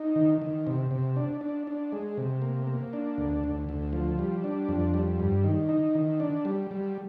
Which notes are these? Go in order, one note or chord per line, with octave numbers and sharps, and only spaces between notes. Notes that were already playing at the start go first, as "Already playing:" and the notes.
Already playing: D#4
D#3
D#3
C3
C3
D4
D4
D4
G#3
C3
A#3
A#3
D4
D2
D2
D2
F3
G3
D4
F2
G3
G2
D#3
D#4
D#3
D4
G3
G3